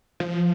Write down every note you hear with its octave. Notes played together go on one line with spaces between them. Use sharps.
F3